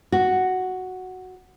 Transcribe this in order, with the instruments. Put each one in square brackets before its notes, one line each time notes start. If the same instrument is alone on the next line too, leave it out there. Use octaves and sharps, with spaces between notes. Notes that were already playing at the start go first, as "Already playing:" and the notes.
[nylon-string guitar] F#4